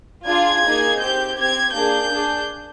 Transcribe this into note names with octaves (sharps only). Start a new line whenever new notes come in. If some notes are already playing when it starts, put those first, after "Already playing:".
D4 F4 G#4 G#6
A#3 D#4 G#4
C4 G4 G6
C4 G4 G#6
A#3 D4 G#4 G6
D4 G#4